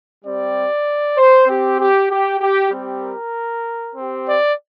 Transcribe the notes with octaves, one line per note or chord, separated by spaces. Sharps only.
G3 C4 G4 D5
C5
C4 G4
G4
G4
G4
G3 C4 G4
A#4
C4 G4
D5